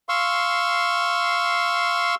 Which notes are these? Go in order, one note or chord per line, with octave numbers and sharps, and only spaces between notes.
F5 C6 C#6 E6